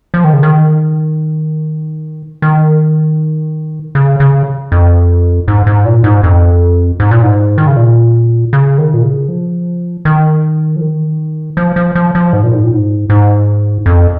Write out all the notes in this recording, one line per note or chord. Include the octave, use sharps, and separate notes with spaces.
F3
D#3
C#3
D#3
D#3
C#3
C#3
F2
G#2
G#2
A#2
G#2
F2
G#2
A#2
G#2
D#3
C#3
A#2
C#3
D#3
A#2
C#3
F3
D#3
F3
D#3
F3
F3
F3
F3
G#2
A#2
G#2
A#2
G#2
G#2
F2